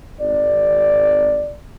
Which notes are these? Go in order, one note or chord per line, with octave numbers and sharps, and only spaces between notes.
G#1 D5